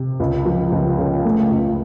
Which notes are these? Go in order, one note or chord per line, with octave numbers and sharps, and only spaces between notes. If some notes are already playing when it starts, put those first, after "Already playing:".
Already playing: C3
C#2
F3
C#2
C#3
A3
C#2